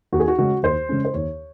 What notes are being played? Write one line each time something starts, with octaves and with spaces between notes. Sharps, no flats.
D#2 F#4
G#4
F#4
C#3 G#3 C#4 F#4
D#2 C5
C#3 G#3 C#4
C5
D#2 C#5